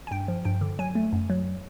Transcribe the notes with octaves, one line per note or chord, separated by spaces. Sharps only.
G#5
G2 G5
F3
G2 G5
D3
F#3 G#5
A3
F#2
F#3